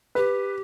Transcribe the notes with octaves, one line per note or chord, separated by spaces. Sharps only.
G4 B4